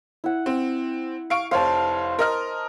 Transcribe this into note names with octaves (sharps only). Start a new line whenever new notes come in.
E4 F#5
C4
F5 C#6 D7
F1 C5 C#5 F5 A5
A#4 D#5 F6